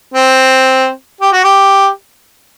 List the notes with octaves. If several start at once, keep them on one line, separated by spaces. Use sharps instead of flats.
C4
G4
F#4
G4